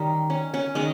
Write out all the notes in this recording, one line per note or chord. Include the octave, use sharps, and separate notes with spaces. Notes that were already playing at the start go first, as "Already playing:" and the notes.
Already playing: D#3 G3 C#4 D#4
C#4
C#4
D#3 G#3 C#4 D#4